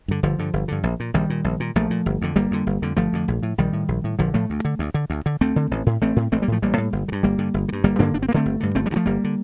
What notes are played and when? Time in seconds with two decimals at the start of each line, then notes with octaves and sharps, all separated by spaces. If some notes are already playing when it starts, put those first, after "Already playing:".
0.08 G2 D3
0.23 G1 D3 F3
0.39 G2 D3
0.53 G1
0.68 G2 D3
0.83 A#1
1.00 A#2
1.14 A#1 D#3 G3
1.30 A#2
1.44 A#1
1.60 A#2
1.76 A#1 F3 A3
1.90 A#2
2.06 G1
2.22 F2 D3
2.36 G1 G3 A#3
2.51 F2 D3
2.67 G1
2.82 F2 D3
2.97 G1 F3 A3
3.13 F2 D3
3.28 A#1
3.43 A2
3.58 A#1 D#3 G3
3.73 A2
3.88 A#1
4.04 A2
4.19 A#1 D3 F3
4.34 A2 F3 A3
4.50 D2
4.65 D3
4.79 D2
4.94 D3
5.10 D2
5.26 D3
5.41 D2 A3 C4
5.56 D3
5.71 A1
5.86 A2
6.01 A1 A3 C4
6.16 A2
6.32 A1 A3 C4
6.42 G3 A#3
6.48 A2 F3 A3
6.62 A1 G3 A#3
6.78 A2
6.93 G1
7.08 D3
7.12 G2
7.23 G1 G3 A#3
7.38 G2 D3
7.54 G1
7.69 D3
7.73 G2
7.84 G1 G3 A#3
7.99 G2 D3 A#3 D4
8.14 G1 D4
8.22 C4
8.29 G2 A#3
8.34 D3 A3 C4
8.45 G1
8.60 G2 D3
8.75 G1 A3 C4
8.86 G3 A#3
8.90 G2 D3
8.96 F3 A3
9.06 G1 G3 A#3
9.24 D3